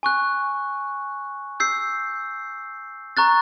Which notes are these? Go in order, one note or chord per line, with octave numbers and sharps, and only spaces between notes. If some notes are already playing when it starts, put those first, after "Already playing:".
G#5 C#6 F#6
E6 G6 C7
A#5 C#6 F#6 A6